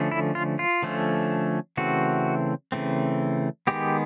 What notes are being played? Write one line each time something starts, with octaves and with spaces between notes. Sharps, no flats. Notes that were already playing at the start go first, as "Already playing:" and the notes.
Already playing: D3 F3 A3 C#4
E4
F4
F4
D3 F3 A3 C#4
C#3 E3 A3 C4 F#4
C#3 E3 A3 C4
D#3 G#3 B3 G4